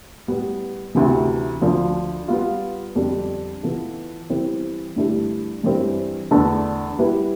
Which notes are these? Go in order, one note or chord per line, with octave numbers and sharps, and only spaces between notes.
A2 G3 B3
D2 C3 E3
D2 D3 F3
G3 B3 F4
F2 D3 G3 D4 A4
E3 B3 F4 A4
E3 G3 C4 E4
G2 D3 A3 E4 G4
G2 E3 G3 C4
E2 D3 A3 D4 A4
G3 B3 E4 B4